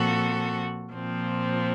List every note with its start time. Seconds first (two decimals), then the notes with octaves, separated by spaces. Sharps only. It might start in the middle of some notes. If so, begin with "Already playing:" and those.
Already playing: A#2 F3 C4 F#4 A4
0.92 A#2 F3 C4